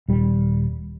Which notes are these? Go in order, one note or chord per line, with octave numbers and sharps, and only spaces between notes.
D#1 G3